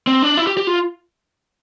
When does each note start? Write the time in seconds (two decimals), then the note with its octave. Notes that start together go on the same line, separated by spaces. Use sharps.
0.07 C4
0.22 D4
0.37 E4
0.47 G4
0.57 G4
0.67 F4